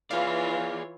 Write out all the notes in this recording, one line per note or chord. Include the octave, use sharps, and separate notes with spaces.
E3 F4 G#4 C#5 D5 F5